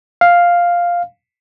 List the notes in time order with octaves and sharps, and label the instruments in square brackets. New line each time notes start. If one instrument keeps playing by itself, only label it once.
[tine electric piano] F5